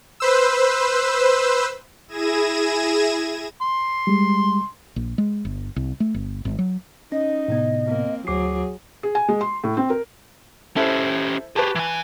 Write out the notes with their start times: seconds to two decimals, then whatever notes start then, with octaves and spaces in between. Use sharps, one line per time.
0.20 B4 C5 E6
2.08 E4 G#4 G#6 A#6 D#7 E7
3.62 C6
4.07 G3 G#3
4.96 A#1
5.18 G#3
5.45 G1
5.76 C2
6.00 A3
6.14 G1
6.45 G#1
6.59 F#3
7.12 C#4 D#4 D#5
7.48 A2 C3 B3
7.87 A#3 C4
8.27 D2 F#3 G#4 D6 C7
9.03 G#4
9.15 G#5
9.29 G#3
9.41 C6
9.64 A2
9.77 C4
9.90 A#4
10.76 C#4 E4 G4 A4 C5
11.56 G4 G#4 B4 A5 C#6
11.75 E3 G#5